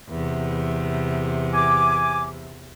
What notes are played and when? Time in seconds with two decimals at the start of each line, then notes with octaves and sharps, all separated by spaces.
0.10 E2 C3
1.54 G#5 D6